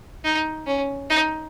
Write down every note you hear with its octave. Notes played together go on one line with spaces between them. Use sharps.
D#4
C#4
D#4